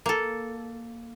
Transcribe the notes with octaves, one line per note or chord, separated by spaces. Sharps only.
A#3 A4